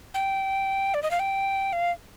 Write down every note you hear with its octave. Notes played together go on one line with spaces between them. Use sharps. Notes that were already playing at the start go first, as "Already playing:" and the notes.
G5
D5
D#5
F5
G5
F5